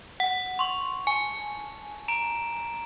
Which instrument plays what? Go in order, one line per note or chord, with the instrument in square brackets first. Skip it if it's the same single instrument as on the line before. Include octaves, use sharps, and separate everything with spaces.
[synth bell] F#5
C6 C#6
[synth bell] G#5 [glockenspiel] A5 C#6
[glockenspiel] A#5 D7 E7